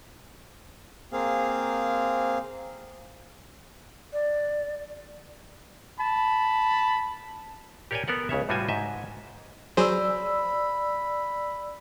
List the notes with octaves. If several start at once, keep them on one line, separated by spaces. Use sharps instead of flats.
A#3 C4 G#4 F5
D5
A5 B5
G4 A#4 C#5 D5 G5 G#5
B3 A4 A#4 F#5
C#2 C#3 C#5 E5
A2 G3 F4 F#4 C5 G#5
G#2 D#5 E5
F#3 G#4 C5 D5 B5 E6